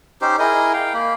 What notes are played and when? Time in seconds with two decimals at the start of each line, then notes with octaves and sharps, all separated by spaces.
0.21 C#4 D#4 G4 C5
0.39 E4 G#4 A#4 D#5
0.73 F5 G5
0.94 A#3 B5